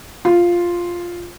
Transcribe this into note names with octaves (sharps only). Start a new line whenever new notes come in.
F4